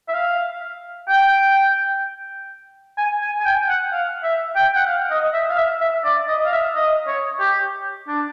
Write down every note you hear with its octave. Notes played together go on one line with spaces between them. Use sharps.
E5
F5
G5
G#5
G#5
G#5
G5
F#5
F5
E5
G5
F#5
F5
D#5
E5
F5
E5
E5
D5
D#5
F5
E5
D#5
C#5
G4
D4